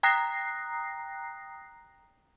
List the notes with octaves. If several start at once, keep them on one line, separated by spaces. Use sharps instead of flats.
G5 A#5 D#6 F#6 A#6 C7